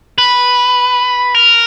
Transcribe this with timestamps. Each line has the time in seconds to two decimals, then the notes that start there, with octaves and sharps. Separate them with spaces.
0.18 B4
1.34 A#4